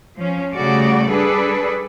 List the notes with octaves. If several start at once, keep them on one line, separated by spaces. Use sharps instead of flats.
F3 C#4
C#3 G3 A3 F#4 D5
G3 D4 G#4 A4 B4 D5